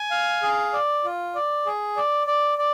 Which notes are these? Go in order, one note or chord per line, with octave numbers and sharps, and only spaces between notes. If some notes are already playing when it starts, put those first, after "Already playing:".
Already playing: G#5
F5
G#4
D5
F4
D5
G#4
D5
D5
D5